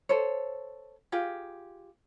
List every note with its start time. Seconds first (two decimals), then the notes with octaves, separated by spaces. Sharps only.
0.09 A4 C5 C#5
1.12 F4 G4 G#4